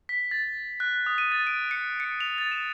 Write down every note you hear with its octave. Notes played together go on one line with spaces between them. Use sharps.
B6
A6
F#6
D#6
D#7
A6
D7
C#7
C#7
F7
A6
E7